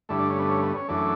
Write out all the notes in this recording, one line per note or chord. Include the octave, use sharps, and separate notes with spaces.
G2 D3 A3 E4
D4
C#4
B3
C#4
B3
C#4
F#2 E3 A3 D4